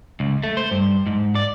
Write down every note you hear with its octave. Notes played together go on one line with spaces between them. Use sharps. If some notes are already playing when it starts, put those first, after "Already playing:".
C#2
A3
C5
G2
G#2
D5